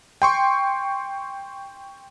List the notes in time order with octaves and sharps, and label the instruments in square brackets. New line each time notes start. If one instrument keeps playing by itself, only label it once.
[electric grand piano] G5 C6 C#6